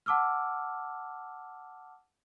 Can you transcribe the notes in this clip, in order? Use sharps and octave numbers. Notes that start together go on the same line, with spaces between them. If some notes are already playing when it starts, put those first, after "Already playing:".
F#5 A5 D6 E6 F6